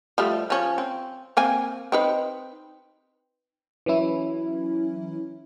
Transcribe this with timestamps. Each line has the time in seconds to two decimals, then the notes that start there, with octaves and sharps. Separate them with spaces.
0.18 F3 G3 A3
0.50 F3 C#4
0.78 C4
1.37 A#3 C4 G#5
1.92 C4 D#4 B4
3.86 E3 F#3 C#4 E4